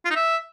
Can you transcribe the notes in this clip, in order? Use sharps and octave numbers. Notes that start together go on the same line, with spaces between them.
F4
D#4
E5